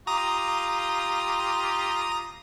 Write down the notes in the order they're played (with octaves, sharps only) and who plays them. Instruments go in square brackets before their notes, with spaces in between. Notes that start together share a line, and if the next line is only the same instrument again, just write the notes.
[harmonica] F4 G4 [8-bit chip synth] A#5 D#6